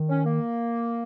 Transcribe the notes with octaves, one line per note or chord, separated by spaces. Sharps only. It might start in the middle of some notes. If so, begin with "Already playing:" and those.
Already playing: D#3
C#4
A#3